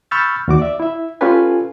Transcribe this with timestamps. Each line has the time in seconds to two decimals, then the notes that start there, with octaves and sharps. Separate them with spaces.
0.11 B5 C#6 E6 F6 G6 A6
0.48 D#2 F#4 D6
0.59 D5 E5
0.80 E4 E5
1.21 C#4 F4 G4 A4 B4 G#5